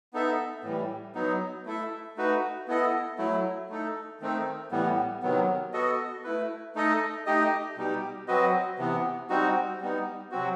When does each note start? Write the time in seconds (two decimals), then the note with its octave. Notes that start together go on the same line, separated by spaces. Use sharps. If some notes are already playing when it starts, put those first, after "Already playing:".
0.13 B3 D#4 A4 E5
0.63 A2 E3 G3
1.15 F#3 B3 D#4
1.66 A3 E4 A4 E5
2.17 A3 D#4 F#4 B4
2.68 B3 E4 A4 D#5
3.18 F#3 A3 E4
3.69 A3 D#4 A4
4.21 D#3 A3 C4 D#4
4.71 A2 E3 G3 B3
5.22 C3 D#3 F#3 B3
5.73 B3 F#4 A4 D#5
6.24 A3 E4 B4
6.75 A3 D#4 A4 D#5
7.26 A3 D#4 G4 D#5
7.77 B2 G3 D#4 G4
8.28 F#3 C4 F#4 B4 D#5
8.78 C3 E3 B3
9.30 G3 C4 D#4 F#4
9.81 G3 B3 D#4
10.31 C3 F#3 C4 F#4